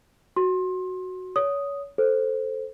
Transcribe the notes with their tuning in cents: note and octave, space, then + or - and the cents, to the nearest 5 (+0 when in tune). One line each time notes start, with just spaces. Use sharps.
F#4 +0 C6 +25
C#5 +30 D#6 +0
A4 +0 C5 +0